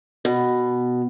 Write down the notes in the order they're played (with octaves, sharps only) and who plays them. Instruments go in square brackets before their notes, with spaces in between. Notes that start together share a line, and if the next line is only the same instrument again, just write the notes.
[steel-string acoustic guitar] B2